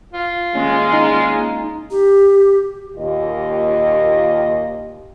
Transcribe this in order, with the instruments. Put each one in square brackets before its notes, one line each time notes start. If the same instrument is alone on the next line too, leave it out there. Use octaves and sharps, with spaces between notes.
[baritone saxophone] F4
[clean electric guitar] D#2 C#4 [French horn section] G#3
[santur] D#4
[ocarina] G4
[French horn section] D#2 A#2 F4 G4 D#5